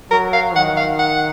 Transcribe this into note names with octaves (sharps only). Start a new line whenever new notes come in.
F#3 A#4
F5
D#3 F#5
F5
F#5